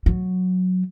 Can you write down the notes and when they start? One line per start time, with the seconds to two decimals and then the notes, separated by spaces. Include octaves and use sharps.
0.06 F#3